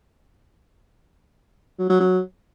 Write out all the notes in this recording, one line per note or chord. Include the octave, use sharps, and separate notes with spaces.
F#3
F#3
F#3